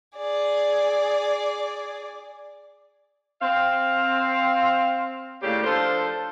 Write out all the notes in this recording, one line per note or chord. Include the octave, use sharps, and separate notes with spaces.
G#4 D5
C4 F5
D#2 A2 C#3 A#3 G4 D5
F3 D4 F4 A4 C5